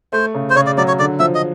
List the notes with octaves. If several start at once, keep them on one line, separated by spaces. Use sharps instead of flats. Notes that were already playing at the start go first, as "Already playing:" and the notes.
A3 C5
C#3
C5
C#3 C#5
D5
F#3 D5
C#5
D3 D5
F3 E5
D#5